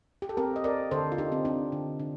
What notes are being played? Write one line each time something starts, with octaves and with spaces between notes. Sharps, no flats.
G4
A4
C4 G4 A#4
D#5
C4 A#4 D5
D3 A4 C5
F4
D3 D#4 G4
C4
C4 D4
D3
D3